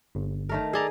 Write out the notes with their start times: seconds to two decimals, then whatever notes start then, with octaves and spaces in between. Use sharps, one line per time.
0.15 G1
0.49 D#3 A3 A#4
0.73 G#4 A4 D5 A#5